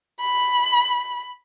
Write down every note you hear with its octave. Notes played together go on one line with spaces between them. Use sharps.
B5